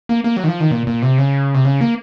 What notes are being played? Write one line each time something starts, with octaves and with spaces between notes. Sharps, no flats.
A#3
A#3
F#3
D#3
F3
D#3
A#2
A#2
C3
C#3
C3
C#3
A#3